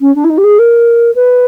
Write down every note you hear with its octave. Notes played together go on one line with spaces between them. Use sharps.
C#4
D4
E4
D#4
G4
G#4
A#4
B4